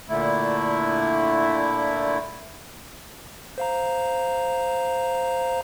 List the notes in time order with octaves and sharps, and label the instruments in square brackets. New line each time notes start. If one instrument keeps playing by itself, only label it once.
[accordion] A#2 D3 A3 E4
[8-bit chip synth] C5 F5 A#5